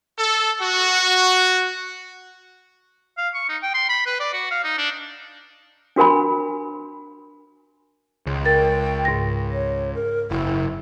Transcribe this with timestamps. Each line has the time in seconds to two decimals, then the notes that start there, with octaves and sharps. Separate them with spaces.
0.18 A4
0.61 F#4
3.17 F5
3.34 C#6
3.49 D#4
3.63 G5
3.74 C6
3.89 B5
4.06 B4
4.20 D5
4.33 F#4
4.51 F5
4.64 D#4
4.78 D4
5.96 D4 F#4 A#4 G#5 B5
8.26 C#2
8.45 A#4 G5 A6
9.05 G#2 A#6
9.53 C#5
9.95 A#4
10.31 F#1 E4